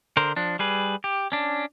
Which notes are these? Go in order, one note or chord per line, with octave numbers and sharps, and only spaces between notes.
D3 A#4 C5
F3 D4
G3 G#4 B4
G4
C#4 D4